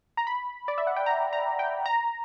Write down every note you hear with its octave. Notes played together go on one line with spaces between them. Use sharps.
A#5
B5
D5
E5
F#5
G5
A#5
A#5
G5
A#5